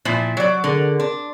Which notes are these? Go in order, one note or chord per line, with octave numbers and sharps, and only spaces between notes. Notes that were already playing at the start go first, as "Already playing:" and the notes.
A#2 F3 E4
F#3 D5
D3 G#4 A#4
D4 C6 D6